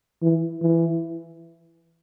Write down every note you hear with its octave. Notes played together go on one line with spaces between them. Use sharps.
E3
E3